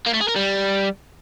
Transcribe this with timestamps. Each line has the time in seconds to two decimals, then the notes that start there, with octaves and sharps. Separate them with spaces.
0.06 A#3
0.14 A3
0.21 G#4
0.29 A#4
0.36 G3